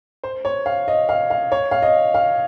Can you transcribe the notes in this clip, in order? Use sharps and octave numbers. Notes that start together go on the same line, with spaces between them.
C5
C#5
F5
D#5
F5
F5
C#5
F5
D#5
F5